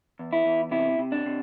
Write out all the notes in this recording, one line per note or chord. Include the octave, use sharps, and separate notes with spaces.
E2
E4
E2
C3 E4
C3
D4
C3